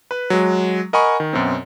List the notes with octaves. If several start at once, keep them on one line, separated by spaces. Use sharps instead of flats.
B4 B5
F#3 G#3
A#4 D#5 F#5 G#5 B5 C#6
D#3
F#2 B2 C4